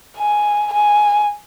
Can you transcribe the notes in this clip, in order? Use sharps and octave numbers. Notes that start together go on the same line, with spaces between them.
G#5
G#5